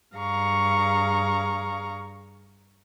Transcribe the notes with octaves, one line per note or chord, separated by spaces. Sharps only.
G2 G#4 F5 A#5 C#6